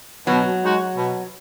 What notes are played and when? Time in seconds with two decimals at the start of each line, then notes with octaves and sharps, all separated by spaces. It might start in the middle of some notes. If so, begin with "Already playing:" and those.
0.27 B2 F#3
0.61 G#3 D#4 F#4
0.95 B2